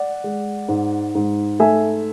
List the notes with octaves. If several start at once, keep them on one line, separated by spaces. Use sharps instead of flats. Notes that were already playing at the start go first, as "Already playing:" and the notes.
Already playing: D5 F#5
G#3
G#2
G#2
A3 E5 G#5